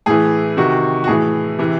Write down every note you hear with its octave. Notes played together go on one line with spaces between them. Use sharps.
A2 E3 G#4
C3 D#3 F#4
F#4
A2 E3 G#4
C3 E3